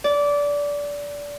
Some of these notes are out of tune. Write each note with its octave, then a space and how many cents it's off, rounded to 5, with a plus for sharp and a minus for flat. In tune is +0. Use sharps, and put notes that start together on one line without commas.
D5 -20